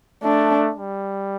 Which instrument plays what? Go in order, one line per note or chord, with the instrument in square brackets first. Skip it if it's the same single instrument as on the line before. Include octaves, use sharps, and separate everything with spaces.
[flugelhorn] A3 [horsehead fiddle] D4
[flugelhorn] G3